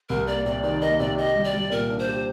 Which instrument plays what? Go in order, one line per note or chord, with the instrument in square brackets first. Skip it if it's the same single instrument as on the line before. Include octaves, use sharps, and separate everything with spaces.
[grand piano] C2 [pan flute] A#4
[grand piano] A#3 [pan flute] D5
[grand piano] C3 [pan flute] D5
[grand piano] D#3 [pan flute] D5
[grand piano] A#3 [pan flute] D#5
[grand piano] C3 [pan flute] D5
[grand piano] G4 [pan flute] D#5
[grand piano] G3
[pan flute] D5
[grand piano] G3
[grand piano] A#2 [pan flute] A#4
[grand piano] D4
[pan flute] C5
[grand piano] G4